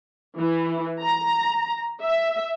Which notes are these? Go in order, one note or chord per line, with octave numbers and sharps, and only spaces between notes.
E3
A#5
E5